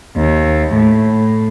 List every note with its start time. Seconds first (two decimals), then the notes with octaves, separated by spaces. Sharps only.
0.16 D#2
0.75 A2